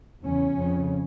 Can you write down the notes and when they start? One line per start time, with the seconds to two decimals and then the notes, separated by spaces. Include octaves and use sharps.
0.25 E2 C#3 C#4
0.56 F2 C#3